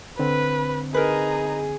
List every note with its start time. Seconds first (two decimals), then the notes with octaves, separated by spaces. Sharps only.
0.19 D3 C4 B4
0.94 D#4 G#4 A#4 B4